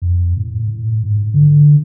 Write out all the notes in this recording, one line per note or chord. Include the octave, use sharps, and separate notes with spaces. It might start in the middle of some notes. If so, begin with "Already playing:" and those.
F2
A2
A2
G#2
D3